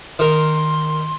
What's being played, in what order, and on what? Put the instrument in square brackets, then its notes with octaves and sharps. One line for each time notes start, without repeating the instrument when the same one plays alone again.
[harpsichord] D#3 A#4 [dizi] C6